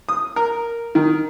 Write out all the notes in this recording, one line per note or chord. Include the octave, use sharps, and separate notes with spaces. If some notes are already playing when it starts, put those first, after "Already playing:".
D#6
A#4
D#3